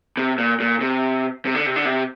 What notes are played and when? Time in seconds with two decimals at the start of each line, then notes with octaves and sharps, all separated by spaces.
0.17 C3
0.38 A#2
0.60 A#2
0.81 C3
1.45 C3
1.55 D3
1.66 C3
1.76 D3
1.85 C3